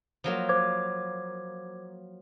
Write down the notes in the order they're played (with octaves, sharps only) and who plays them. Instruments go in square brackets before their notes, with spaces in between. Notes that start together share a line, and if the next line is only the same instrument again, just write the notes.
[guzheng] F3 F#3 A#3
[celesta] C5 D6 G#6